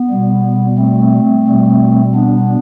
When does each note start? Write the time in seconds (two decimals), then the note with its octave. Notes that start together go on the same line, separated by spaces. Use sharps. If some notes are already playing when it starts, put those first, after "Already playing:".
Already playing: B3
0.11 B2 G3
0.78 A3 C4
1.47 B2 G3
2.15 B3 D4